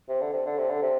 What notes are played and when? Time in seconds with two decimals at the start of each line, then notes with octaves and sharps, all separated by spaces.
0.09 C3
0.21 D3
0.34 C3
0.46 D3
0.58 C3
0.69 D3
0.83 C3